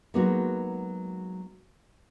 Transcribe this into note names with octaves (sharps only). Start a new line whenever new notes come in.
F#3 G#3 A#3 B3 D#4 F#4